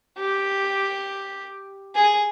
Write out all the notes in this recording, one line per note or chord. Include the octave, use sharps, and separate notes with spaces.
G4
G#4